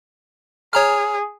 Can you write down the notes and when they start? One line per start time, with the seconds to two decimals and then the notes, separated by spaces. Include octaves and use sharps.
0.73 G#4 C#5 A#5 F6